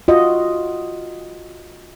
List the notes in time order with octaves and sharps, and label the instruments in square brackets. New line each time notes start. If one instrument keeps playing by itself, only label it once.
[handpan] F4 F#4 D#5